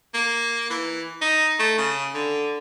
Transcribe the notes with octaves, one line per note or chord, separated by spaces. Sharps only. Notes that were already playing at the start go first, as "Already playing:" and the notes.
A#3
E3
D#4
A3
C#3
D3